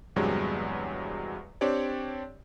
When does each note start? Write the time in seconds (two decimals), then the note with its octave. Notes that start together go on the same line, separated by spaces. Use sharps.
0.16 E2 G2 C3 F#3 G#3
1.61 C4 D4 G4 C#5 D5